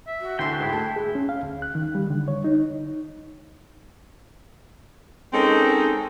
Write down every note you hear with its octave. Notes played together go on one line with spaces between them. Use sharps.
E5
F#4
D2 E4 A4 G5 C6
G#2 E4
A3 A5
G#4
C#4
F5
D2
F#6
D#3
G3
D3
C#5
D#4
G#3 C4 C#4 D#4 A4 A#4